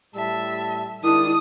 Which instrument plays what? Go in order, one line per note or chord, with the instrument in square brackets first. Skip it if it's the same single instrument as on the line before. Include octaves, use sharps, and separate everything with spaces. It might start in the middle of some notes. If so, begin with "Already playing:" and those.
[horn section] A2 G3 A5 [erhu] E5
[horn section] D#3 G#3 D4 [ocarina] E4 [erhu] D#6